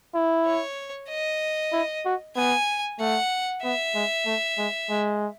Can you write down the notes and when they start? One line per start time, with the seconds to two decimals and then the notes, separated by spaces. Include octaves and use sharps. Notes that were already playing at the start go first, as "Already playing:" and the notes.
0.15 E4
0.47 C#5
1.09 D#5
1.72 E4
2.05 F#4
2.36 B3 G#5
3.00 A3 F#5
3.63 B3 E5
3.95 G#3
4.26 A3
4.58 G#3
4.90 G#3